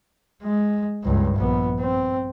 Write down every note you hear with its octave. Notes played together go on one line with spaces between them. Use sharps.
G#3
C#2 G2
A#1 B3
C4